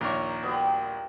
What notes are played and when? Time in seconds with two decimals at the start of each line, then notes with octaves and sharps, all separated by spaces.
0.01 A#1 D#2 A#4 C#5
0.43 G3 B3 F#4 A#5
0.56 A#4 G5